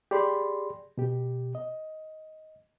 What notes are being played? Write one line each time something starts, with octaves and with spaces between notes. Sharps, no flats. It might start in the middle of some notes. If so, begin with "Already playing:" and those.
G4 G#4 D5 B5 C6
B2 G4
D#5